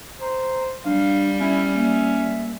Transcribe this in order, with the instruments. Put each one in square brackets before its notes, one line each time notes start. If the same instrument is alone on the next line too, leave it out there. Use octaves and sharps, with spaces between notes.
[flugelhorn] C5 [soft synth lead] A#5
[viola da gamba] G3 [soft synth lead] D4 [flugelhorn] F5
[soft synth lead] B3 [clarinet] C#4 [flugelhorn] E4
[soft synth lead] A#3 [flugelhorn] E5